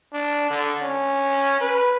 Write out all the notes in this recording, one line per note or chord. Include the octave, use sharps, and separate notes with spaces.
D4
D3
C#4
B4